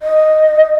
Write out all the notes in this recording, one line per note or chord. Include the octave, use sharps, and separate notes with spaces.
D#5